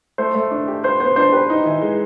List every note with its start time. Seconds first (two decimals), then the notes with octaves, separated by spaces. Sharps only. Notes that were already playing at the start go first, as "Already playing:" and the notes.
0.18 A3 C5
0.35 A3
0.51 D4
0.68 G4
0.83 B4 C5
1.00 B3 C5
1.16 D4 C5
1.33 G4 B4
1.50 D#4
1.65 E3
1.82 G#3